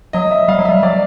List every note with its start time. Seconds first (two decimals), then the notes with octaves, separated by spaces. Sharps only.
0.13 F#3 D#5
0.31 E5
0.48 G3 F5
0.59 F#3
0.65 G3 E5
0.83 F#3 D5